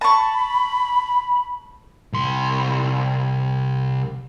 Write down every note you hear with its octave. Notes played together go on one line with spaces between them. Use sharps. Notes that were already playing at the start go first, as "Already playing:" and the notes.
A5 B5 C#6
C2 C6